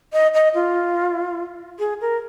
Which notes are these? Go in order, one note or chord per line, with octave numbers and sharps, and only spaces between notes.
D#5
D#5
F4
G#4
A#4